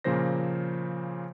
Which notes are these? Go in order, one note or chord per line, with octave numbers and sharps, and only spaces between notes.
A#2 C#3 F3 A#3 C5 A#6